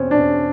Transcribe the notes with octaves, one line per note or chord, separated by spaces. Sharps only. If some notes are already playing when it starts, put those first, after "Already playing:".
Already playing: E2 B2 C4 C#4
E2 B2 D4